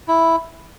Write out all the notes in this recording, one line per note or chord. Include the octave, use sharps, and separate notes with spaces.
E4